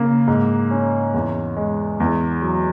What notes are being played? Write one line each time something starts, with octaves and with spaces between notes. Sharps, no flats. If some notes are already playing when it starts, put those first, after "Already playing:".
Already playing: C#3 A#3
G#2
C#4
E2
G#3
E2
F#3